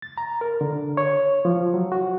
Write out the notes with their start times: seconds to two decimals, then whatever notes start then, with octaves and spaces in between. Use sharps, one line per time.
0.02 A6
0.18 A#5
0.41 A#4
0.61 D3
0.97 C#5
1.45 F3
1.74 F#3
1.92 F#4